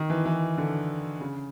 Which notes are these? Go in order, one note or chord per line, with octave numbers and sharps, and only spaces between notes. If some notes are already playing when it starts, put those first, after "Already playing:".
Already playing: D#3
E3
E3
D3
C#3